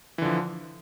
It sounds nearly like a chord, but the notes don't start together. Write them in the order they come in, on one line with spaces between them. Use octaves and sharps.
E3 D3 F3